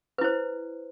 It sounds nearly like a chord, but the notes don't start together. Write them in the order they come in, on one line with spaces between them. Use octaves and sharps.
B4 E4 C5